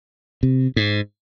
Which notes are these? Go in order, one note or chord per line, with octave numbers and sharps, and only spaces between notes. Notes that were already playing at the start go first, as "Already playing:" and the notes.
C3
G#2